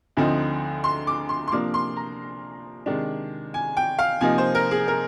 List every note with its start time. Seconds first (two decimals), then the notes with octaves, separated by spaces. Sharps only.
0.17 D2 D3 F3 C4 D#4
0.84 C6
1.07 D6
1.29 C6
1.48 C6
1.51 C3 F3 A#3 D4 D6
1.74 C6
1.96 A#5
2.86 C3 D#3 G#3 D4
3.54 G#5
3.77 G5
3.99 F5
4.21 C3 F3 A#3 D#4 G#5
4.38 C5
4.55 A#4
4.71 G#4
4.88 A#4